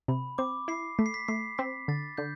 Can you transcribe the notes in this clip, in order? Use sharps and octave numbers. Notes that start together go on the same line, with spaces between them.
C3 B5
C4 D6
E4 C7
A3 B6
C7
B6
A3 C7
C4 B6
D3 A6
D3 G6